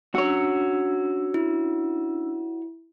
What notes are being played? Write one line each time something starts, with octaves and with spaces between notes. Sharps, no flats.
C#4 D4 F#4 C#5 E6
E4